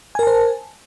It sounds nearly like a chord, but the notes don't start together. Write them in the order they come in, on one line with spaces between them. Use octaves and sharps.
G#5 A#4 A5 C5